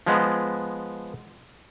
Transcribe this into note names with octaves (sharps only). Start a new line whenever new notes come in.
F3 G#3 B3